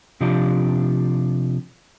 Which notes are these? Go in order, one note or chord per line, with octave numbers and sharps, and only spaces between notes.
C3 F3 D4 F4 G4